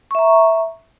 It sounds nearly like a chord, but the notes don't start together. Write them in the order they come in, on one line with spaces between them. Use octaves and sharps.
C#6 E5 A#5